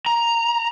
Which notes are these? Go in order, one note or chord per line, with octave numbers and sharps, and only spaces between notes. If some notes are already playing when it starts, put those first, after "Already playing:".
A#5